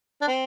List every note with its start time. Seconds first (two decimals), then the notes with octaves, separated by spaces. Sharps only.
0.22 D4
0.27 C4